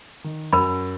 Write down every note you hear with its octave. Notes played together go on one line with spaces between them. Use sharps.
D#3
F#2 F#4 A#4 B5